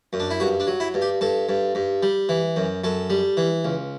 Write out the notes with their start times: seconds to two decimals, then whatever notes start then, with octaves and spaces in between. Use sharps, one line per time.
0.13 F#2
0.20 D4
0.31 E4
0.40 G2 F#4
0.60 D4
0.67 F#3
0.80 E4
0.94 G2
1.02 G4
1.21 G2 A4
1.49 G2
1.75 G2
2.03 G3
2.29 E3
2.56 F#2
2.84 F#2 A4
3.10 G3
3.37 E3
3.65 C#2